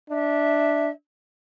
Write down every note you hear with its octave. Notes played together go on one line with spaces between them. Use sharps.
D4 E5